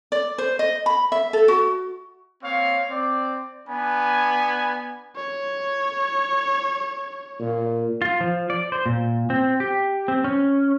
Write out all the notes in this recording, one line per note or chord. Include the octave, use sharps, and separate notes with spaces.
D5
C5
D#5
B5
E5
A4
F#4
A#3 C4 C#5 F5
C4 D5
B3 D4 G#5 B5
C#5
A#2
F4
F3
D5
C5
A#2
C4
G4
C4
C#4